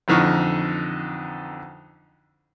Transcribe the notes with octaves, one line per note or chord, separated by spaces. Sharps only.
A1 F2 D3 D#4 C#6 F6